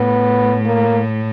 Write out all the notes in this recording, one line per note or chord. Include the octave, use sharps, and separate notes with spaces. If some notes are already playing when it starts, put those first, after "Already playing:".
Already playing: A2 B3
A#3